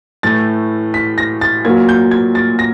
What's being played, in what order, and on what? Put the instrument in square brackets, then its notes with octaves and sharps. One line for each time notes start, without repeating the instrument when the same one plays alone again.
[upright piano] A2 E3 A3 A6
B6
A#6
A6
A#2 F#3 A#3 G#6
G6
G#6
A6
A#6